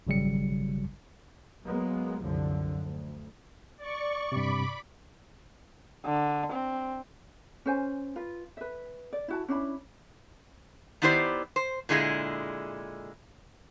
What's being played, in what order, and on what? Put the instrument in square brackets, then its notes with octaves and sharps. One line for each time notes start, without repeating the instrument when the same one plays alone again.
[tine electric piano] G#1 C#3 F#3 G3 C#7
[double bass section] F#3 G#3 A#3 B3
C2 F#2 D3 F3
D2
[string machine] D5 C#6
[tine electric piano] G2 C3 [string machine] B5 D6
[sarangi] D3
C4
[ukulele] C#4 C5 G#5
F4 B4
B4 E5
D5
E4 F#4 A5
C#4 D4 E4 B5
[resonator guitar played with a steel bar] D#3 B3 E4 G4 C5 D5
C5
A#2 D3 G#3 E4 G#4